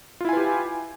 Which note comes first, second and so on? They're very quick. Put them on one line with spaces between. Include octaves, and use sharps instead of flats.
F4 E4 G#5 B4 G4